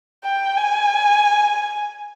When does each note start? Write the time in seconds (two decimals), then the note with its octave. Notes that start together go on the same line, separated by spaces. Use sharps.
0.24 G5
0.57 G#5